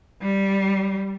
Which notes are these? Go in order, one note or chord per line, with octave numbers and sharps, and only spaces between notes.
G3